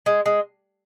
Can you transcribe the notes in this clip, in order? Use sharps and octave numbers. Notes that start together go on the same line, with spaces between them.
G#3
G#3